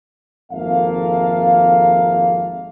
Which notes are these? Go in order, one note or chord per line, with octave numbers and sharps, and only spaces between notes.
G#1 F2 A#3 A4 E5 F5